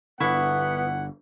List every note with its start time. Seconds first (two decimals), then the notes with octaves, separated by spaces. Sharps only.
0.20 G1 D3 B3 E4 F#5 C#6